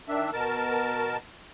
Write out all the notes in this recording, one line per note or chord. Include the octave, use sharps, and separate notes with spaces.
D#3 D4 E5
B2 A#4 A5